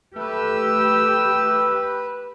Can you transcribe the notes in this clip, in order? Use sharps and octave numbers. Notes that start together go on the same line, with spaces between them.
A3 G4 B4 E6